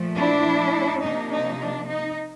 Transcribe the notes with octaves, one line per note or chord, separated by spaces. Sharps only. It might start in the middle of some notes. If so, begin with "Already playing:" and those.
Already playing: A#2 F3 A3
D4 E4
C3 F3 A#3 D4 D#4
D#4
D4
D#4